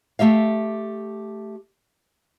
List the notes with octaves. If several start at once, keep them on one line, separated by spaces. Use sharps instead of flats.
A3 G4 E5 F5